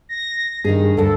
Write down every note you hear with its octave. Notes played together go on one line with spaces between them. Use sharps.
A#6
G2 D#3 D#4 G#4
D2 G2 A4